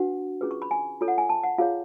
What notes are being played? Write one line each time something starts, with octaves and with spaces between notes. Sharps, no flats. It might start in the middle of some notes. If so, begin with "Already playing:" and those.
Already playing: D4 F#4 B4 F#5
C#4 F4 G#4 B4
C#6
B5
G#5
F4 A4 C#5
F#5
G#5
A5
F#5
F4 G#4 C#5 F5